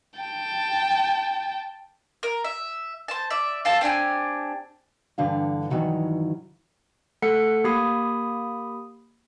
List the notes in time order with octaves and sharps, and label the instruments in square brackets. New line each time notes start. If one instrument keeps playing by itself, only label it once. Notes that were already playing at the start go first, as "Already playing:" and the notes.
[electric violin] G5 A5
[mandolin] A#4
E5
C5 A5
D5 E5
F4 A4 A5
C4 D4 G4 G#5
[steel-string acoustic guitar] G2 D3 E3 F5
G2 A#2 D#3 E3 F#3
[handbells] A3 A4 F#5 C#7
A#3 G4 B5 D#6